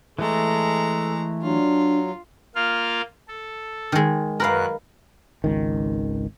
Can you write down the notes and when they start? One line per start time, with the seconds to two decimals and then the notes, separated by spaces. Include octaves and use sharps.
0.19 E3 G#3 A3 A4 A#5
1.42 F#3 D4 F4
2.55 A#3 F4 F5
3.28 A4
3.92 D#3 G#3
4.40 F#2 A#4 B4 F5 F#6
5.44 G#1 C#2 D#3